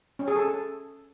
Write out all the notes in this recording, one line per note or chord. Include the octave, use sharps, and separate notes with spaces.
C#4
G#4
A4